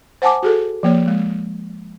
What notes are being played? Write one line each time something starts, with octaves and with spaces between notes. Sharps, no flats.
C5 F#5 G#5 A5 D6
F#4 G#4 A4
F3 A#3 C#5
G#3